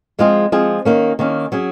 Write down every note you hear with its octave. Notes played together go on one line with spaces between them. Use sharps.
F3 G#3 C4 F4 G#4
F3 G#3 C4 F4 G#4
D#3 A#3 C#4
D#3 A#3 C#4
F#3 C#4 G#4